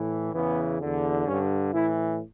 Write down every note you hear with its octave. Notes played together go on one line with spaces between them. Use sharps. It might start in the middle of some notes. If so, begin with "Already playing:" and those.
Already playing: A2 E3
E2 C#3 E3 B3
E2 D3
G2 D3 C#4
A2 E3 E4